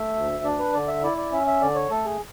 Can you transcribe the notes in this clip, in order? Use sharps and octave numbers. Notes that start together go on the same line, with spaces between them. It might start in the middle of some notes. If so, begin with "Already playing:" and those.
Already playing: A3 E5
D2
D4 D5
B4
D3 D5
E5
E4 D5
D5
C#4 E5
E5
D3 D5
C#5
A3 A4
G#4